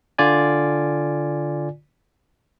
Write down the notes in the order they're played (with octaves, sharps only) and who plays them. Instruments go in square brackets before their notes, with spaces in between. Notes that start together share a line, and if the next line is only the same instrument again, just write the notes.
[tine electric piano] D3 F4 D5 G#5